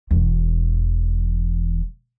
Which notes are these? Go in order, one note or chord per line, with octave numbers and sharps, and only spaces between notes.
E1 E2